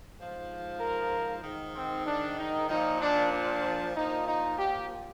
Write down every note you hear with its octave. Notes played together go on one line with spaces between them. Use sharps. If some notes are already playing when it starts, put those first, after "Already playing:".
G#2 F3
A#4
G#2 D#3
C4
D4
D#4
A#2 F3 D#4
D4
D4
A#2 F3 D#4
D#4
G4